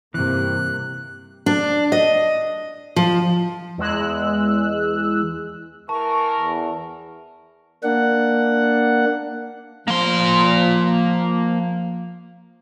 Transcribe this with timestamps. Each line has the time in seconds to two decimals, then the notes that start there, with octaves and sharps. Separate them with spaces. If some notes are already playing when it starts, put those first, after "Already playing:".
0.14 G2 C3 E3 A#3 F#6
1.46 D4
1.92 D#5
2.96 F3
3.78 E2 G#3 E6 F#6
5.89 E3 A#4 A5 C#6
6.39 E2
7.83 A#3 D4 F#5
9.88 F3 A#3 C6